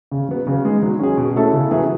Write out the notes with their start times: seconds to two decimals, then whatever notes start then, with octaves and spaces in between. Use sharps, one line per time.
0.12 C#3
0.29 F#3 B3
0.47 C#3
0.65 G#3 D#4
0.83 F#3
1.00 C#4 G#4
1.17 B2
1.36 A3 C#4 E4 A4
1.53 C#3
1.71 F#3 B3 E4 G#4